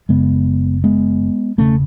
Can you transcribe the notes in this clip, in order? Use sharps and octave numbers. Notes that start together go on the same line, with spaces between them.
F#1 F#2 C#3 G#3 B3
G#3 B3
E1 D#2 C#3 A3 C#4